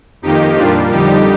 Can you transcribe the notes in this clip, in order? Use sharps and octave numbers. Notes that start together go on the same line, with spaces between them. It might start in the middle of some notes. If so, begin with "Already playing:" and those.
F2 D#3 A#3 D#4 G4
A#2 G3 A#3 D4 F4
F2 D3 G3 D#4 G4